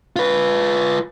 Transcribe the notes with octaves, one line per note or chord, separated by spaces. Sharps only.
F4 B4